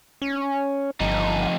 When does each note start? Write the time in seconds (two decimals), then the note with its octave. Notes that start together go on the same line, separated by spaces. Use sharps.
0.22 C#4
1.00 G1 F2 D#4